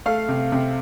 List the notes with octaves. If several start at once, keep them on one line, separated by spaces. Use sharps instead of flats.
A3 F5
C3
C3